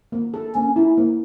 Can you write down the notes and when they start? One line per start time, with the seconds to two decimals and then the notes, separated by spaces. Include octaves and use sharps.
0.12 A#3
0.34 A4
0.55 A#3 C#4
0.76 E4
0.97 A#3